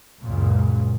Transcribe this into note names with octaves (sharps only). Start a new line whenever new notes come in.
C#2 F#2 A#2